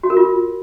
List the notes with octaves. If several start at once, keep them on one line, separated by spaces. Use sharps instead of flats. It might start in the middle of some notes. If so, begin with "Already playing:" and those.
F#4
A#4
F4